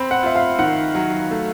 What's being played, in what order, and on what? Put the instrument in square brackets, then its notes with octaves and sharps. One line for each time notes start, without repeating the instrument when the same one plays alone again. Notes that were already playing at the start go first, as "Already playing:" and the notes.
Already playing: [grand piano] C4 [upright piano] B5
[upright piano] F#5
[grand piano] F4 [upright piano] E5
[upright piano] F5
[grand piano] D#3 [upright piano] F#5
[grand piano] F#3
A3